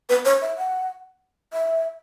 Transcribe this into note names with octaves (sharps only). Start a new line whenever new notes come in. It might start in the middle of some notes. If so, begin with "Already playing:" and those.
B4
C#5
E5
F#5
E5